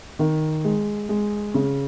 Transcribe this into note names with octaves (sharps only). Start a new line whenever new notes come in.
D#3
G#3
G#3
C#3